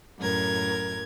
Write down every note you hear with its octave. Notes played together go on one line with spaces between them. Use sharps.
F#2 A2 A#4 G#6